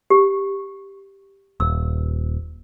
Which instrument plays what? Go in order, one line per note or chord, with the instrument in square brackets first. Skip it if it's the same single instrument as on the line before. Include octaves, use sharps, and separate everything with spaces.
[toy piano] G4
[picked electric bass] D#1 [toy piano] E6